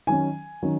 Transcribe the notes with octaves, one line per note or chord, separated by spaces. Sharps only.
D#3 F#3 C#4 G#5
D#3 F#3 C#4